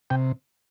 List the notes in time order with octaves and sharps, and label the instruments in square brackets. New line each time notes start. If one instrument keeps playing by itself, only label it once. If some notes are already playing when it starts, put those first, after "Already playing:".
[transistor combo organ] C3 G5